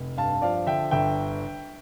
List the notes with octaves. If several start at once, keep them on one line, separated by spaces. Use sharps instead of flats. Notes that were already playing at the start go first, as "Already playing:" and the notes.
Already playing: F1
G2 F5 A5
F3 D5 F5
D3 E5 G5
G1 E5 G5